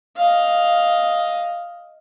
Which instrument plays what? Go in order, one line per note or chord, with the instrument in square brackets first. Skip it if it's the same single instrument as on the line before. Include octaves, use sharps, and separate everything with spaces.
[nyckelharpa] D#5 F5